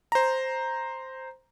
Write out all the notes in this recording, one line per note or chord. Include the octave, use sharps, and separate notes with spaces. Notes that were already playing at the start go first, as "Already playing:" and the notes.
C5 A#5